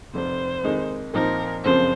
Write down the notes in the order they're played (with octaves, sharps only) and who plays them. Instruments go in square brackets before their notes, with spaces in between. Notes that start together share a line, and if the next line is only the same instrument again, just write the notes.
[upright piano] F1 F2 C3 [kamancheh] C5
[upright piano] F2 D#3 G#3 D#4
[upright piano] A#2 F3 C4 D#4 [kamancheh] A#4
[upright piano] F#1 F2 C#3 F3 C4 [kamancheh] C5